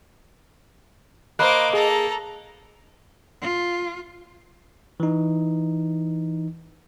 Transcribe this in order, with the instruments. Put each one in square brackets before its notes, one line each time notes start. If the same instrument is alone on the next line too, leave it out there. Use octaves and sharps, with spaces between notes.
[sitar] A#3 [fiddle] C5 D6 [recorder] D#5 [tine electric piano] A#5 B5 F#6
[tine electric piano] G#4 [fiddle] A4 A#5
[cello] F4
[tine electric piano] E3 D#4